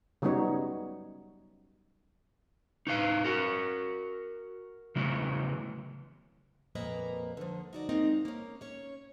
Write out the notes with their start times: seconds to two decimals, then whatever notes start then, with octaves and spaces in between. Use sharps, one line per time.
0.22 C#3 F#3 G3 B3 D#4 C#5
2.87 D#4 B4 F5
3.25 F#4 A#4
4.96 C#3 E3 F#3 A3
6.75 F2 A#2 A#3 B4 D#5 A#5
7.37 D3 F3
7.73 D#4 F#4 D5
7.89 G#3 A#3 C4 D#4
8.25 A#3 C#4
8.61 C#4 C#5